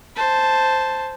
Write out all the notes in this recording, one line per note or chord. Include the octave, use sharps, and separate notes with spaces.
C5 A5